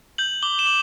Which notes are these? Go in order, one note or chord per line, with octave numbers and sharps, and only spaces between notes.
G6 F#7
D6 G7
E7
D6 F#7